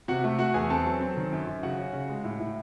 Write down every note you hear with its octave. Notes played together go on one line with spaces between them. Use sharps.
C3 F#4 F#5
A3
A3 F#4 F#5
E2 G#4 G#5
C4 A4 A5
F#3
C4
D#3
F#2
F#2
C#3 F#4 F#5
C#4
C#3
G#3
A2
A2